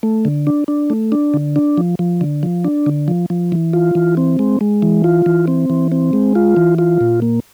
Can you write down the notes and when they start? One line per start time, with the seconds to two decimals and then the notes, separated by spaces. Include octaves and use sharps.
0.03 A3
0.25 D3
0.47 D4
0.68 D4
0.90 A3
1.12 D4
1.34 D3
1.56 D4
1.77 F3
1.99 F3
2.21 D3
2.43 F3
2.64 D4
2.86 D3
3.08 F3
3.30 F3
3.52 E3
3.73 F4
3.95 E3
4.17 C4
4.39 G#3
4.61 G#3
4.82 E3
5.04 F4
5.26 E3
5.48 C4
5.70 E3
5.92 C4
6.13 G#3
6.35 F4
6.57 E3
6.78 F4
7.01 A#2
7.22 A#3